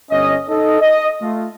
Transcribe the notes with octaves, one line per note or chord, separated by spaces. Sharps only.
G1 C#4 D#5
D#4 A4 D#5
D#5
A3 F4